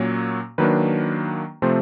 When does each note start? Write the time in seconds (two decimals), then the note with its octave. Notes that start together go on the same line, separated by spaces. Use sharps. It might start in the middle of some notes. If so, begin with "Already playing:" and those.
Already playing: A#2 F#3 A#3 C#4 C#5
0.58 D#3 F#3 A#3 D4 B4
1.62 C3 F3 A3 C4 C5